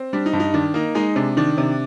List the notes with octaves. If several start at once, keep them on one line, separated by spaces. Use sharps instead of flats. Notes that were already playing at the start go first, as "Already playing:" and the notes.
Already playing: C4
G3 D4
D#4
G2
D#4
D#3 D4
A#3 D#4
G#3 D#4
C3 D4
D#3 D4
C3